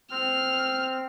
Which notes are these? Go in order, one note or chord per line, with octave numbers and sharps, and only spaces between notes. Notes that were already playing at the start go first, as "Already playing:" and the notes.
C4 F6